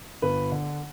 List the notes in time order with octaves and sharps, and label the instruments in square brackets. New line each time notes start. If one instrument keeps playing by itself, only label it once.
[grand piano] G1 B4
D3